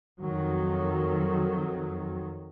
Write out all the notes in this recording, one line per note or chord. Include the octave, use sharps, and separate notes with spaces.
F2 D#3 F#3